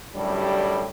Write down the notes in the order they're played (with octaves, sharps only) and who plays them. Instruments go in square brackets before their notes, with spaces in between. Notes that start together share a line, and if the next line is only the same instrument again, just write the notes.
[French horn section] F#2 A2 D3 G3